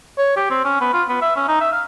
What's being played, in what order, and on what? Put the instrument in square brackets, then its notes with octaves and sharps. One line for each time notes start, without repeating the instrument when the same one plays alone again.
[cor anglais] C#5
G4
C4
C#4
B3
F4
B3
E5
C#4
D#4
E5
F5